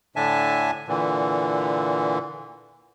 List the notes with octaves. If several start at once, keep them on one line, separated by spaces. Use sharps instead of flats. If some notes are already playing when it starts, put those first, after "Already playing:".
A2 D3 D4 E5 G#5 A5
A#2 D3 E3